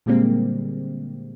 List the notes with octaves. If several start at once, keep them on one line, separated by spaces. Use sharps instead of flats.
A#2 D3 G3 G#3 A#3 C4